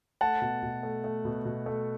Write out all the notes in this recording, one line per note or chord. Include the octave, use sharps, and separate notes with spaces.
A3 F#5 A5
B2
B2
A3
A3
B2
B2
A3